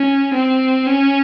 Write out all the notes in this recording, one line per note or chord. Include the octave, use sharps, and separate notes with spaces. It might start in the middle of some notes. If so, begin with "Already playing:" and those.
Already playing: C#4
C4
C#4